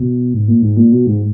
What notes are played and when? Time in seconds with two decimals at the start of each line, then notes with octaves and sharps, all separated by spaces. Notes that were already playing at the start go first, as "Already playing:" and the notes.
Already playing: B2
0.34 G#2
0.48 A#2
0.62 G#2
0.77 A#2
0.92 B2
1.06 G#2